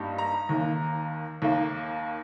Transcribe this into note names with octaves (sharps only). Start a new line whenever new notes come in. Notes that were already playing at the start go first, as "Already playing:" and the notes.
Already playing: G2 G3 A#3 D#4
A#5
D#2 D#3 A#3
D#2 D#3 A#3